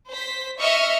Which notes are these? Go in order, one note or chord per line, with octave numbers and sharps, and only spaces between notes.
C5 B6
D#5 E5 C#6 F6